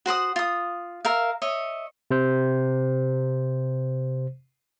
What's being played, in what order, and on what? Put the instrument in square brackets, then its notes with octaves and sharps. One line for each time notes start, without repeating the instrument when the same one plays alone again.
[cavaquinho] F#4 C5 F#5 D#6
F4 D#6
A#4 E5 F5
C#5 D#5 E5
[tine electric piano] C3 C5